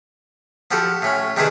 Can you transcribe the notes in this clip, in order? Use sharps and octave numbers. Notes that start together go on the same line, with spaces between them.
F3 F#4 G4 A4 B5
A2 C#4 B5
C3 D#3 D4 E4 G#4 B4